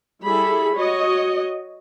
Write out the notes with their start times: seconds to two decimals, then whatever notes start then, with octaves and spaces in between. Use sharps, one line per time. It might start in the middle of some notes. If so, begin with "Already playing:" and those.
0.24 G3 E4 G#4 A4 B5
0.74 F#4 C#5 D#5